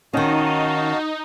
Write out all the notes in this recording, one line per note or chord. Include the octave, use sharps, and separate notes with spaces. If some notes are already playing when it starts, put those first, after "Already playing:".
D#3 C#4 D#4 F#4 F5 A5